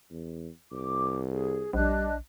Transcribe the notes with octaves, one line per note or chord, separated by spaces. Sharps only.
E2
C2 D6
G#4
A#1 G3 D4 D#5 F#6